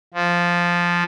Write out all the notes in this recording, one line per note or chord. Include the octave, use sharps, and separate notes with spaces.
F3